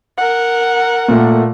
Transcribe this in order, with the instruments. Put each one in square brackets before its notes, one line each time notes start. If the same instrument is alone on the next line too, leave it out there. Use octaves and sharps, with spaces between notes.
[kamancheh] A#4 F#5
[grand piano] A#2 A3